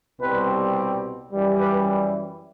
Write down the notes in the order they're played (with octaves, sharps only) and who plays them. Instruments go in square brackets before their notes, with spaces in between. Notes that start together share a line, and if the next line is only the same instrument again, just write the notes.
[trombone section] C2 B2 G3 C4 B4
F#2 E3 G3
B4